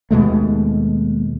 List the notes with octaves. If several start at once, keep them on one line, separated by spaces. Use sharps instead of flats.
D#2 B2 G#3 A3